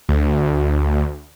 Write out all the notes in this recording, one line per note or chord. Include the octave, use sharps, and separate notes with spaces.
D2